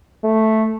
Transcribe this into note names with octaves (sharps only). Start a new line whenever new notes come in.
A3